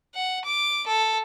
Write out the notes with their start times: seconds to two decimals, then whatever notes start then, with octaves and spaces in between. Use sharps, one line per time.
0.15 F#5
0.45 D6
0.87 A4